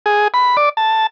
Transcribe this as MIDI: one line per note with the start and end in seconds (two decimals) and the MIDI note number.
0.06 0.28 68
0.34 0.57 83
0.57 0.69 74
0.77 1.07 81